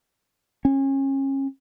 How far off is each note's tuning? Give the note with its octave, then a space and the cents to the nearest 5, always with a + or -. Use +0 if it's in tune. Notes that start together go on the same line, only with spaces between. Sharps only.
C#4 -30